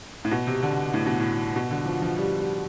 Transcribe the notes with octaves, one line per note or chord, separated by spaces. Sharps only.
A2
B2
C3
D3
A2
B2
A2
B2
D3
F3
F3
G3
G3